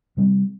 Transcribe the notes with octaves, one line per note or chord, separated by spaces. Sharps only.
C3 G3 C4